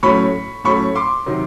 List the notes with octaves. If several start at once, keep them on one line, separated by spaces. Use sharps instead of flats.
A2 F#3 A3 C#4 B5 C#6
A2 F#3 A3 C#4 B5 C#6
C6 D6
C3 D#3 F#3